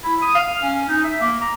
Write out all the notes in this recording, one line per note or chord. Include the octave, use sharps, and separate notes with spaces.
E4
D#6
F5
C#4
D#4
E5
A#3
A#5